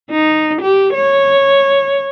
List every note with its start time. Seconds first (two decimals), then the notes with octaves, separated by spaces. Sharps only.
0.11 D#4
0.61 G4
0.93 C#5